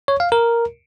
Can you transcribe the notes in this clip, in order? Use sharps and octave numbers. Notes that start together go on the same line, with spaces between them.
C#5
F5
A#4